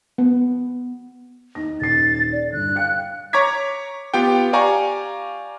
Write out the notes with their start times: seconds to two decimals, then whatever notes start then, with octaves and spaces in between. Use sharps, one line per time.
0.18 B3
1.55 D#2 D#4 A#6
1.81 D#1 D#4 A6 C7
2.33 D5
2.53 G2 D3 F#6
2.76 F5 G5 C#7
3.33 C#5 A#5 C#6 D6 G#6 B6
4.14 B3 F4 G4 G5
4.53 G4 D5 F5 G#5 A#5 C#6